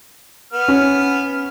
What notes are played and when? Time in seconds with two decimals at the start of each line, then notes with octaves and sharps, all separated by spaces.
0.53 B3 F6
0.68 C#4